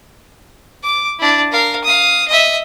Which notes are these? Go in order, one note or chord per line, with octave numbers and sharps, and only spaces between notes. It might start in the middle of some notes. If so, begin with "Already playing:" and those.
D6
D4 E4
A#4 F5
F5 D#6
D#5 E5